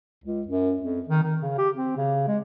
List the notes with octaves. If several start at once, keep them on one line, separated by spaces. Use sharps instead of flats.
C#2
F#2
F2
D#3
D#3
C#3
G4
C4
C#3
G#3